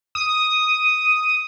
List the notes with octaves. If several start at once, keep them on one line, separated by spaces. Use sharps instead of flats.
D#6